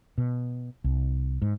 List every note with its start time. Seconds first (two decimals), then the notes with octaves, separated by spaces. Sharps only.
0.18 B2
0.84 C2
1.42 G#2